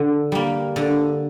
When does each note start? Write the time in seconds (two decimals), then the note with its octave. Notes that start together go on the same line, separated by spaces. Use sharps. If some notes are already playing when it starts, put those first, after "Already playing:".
Already playing: D3
0.32 G3 A#3
0.76 D3